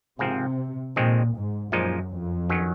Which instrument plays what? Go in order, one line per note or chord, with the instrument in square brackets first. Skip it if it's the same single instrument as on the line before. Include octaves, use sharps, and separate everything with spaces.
[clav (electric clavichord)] G#1 G#2 F3 C4 [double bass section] C3
[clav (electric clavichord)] F2 D#3 G#3 C4 [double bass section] A#2
[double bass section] G#2
[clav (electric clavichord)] A#1 A#2 F3 G#3 D#4 [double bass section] F#2
[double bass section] F2
[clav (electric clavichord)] D#3 F#3 C#4